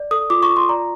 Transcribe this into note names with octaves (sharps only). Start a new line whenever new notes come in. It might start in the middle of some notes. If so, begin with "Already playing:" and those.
Already playing: D5
A4 D#6
F4 D6
C#6
F4
C6
D5 A#5